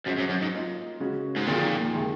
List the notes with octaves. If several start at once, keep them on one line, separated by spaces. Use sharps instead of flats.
F#2 G#3 C#4 F#4 C5 D#5
F#2
F#2
G#2
A#3 F4 A#4 D#5
C#3 G#3 C#4 F#4
G#2
F2 A#2 D#3 A#3 F4 G#4
C3 D#3 G#3